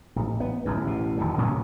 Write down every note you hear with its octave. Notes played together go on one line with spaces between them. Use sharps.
A1
B3
D1 A1 F#2
A1 B2
D#1 G#1 D#3 F#3
A2 C#3 F#3 B3